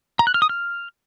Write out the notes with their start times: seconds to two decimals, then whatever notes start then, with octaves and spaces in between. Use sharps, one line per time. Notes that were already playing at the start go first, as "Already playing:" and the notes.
0.19 A#5
0.27 F#6
0.34 F6
0.42 D#6
0.49 F6